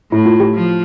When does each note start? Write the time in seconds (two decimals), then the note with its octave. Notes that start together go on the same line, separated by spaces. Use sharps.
0.12 A2 E4
0.26 F4
0.40 G4
0.54 F3